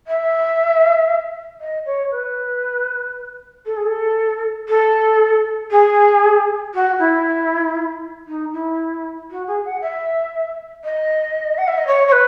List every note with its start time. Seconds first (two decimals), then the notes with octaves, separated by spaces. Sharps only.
0.07 E5
1.61 D#5
1.86 C#5
2.11 B4
3.66 A4
3.76 G#4
3.86 A4
4.69 A4
5.71 G#4
6.74 F#4
6.99 E4
8.27 D#4
8.53 E4
9.31 F#4
9.47 G#4
9.65 F#5
9.81 E5
10.84 D#5
11.58 F#5
11.68 E5
11.78 D#5
11.87 C#5
12.07 C#5
12.12 B4